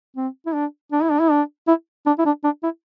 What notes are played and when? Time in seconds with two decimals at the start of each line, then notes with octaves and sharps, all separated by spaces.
0.17 C4
0.46 E4
0.54 D4
0.92 D4
1.03 E4
1.11 D4
1.21 E4
1.31 D4
1.68 E4
2.06 D4
2.19 E4
2.25 D4
2.44 D4
2.63 E4